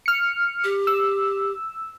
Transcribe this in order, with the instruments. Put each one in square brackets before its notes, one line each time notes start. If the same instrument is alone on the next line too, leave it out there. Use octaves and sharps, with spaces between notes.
[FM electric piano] F6 C#7
[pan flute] G4
[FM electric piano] E6